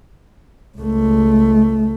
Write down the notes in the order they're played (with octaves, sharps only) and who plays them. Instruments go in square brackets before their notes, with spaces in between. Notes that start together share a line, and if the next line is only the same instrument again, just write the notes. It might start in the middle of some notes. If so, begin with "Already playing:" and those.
[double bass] C#2 A3